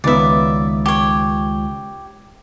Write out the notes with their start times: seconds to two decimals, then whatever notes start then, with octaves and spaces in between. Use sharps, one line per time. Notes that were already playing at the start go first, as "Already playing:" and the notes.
0.04 C#2 D#3 B3 D5 E5
0.86 G4 C#5